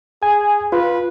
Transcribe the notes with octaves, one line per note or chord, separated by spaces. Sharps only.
G#4 G#5
F4 B4